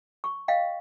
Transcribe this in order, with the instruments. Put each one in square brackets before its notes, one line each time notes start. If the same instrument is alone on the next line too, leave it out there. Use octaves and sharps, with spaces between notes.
[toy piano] C#6
D#5 F5 G5